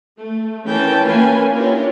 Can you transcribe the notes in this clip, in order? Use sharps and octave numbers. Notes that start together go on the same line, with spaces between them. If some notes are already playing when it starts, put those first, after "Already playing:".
A3
E3 C#4 A#4 G5 A5
A#3 C#4 F4 A#4 B4 G#5
D4 E4 F4 G4 A#4 C#5